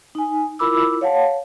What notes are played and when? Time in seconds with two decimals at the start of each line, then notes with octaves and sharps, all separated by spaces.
0.15 D#4 G#5
0.59 E4 F4 A#4 B5 D6 E6
1.01 C#5 F5 F#5 A5